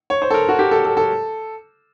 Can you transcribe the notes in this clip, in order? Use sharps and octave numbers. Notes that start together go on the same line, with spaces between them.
C#5
C5
A4
A#4
F#4
G4
A4
A4
A4